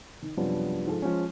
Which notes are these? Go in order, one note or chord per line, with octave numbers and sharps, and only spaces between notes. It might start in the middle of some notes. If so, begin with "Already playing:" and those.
D#3
F#2 C3 F3 G3 B3 D4
G#2 F3 G#4 A4
F3 G#3 C#4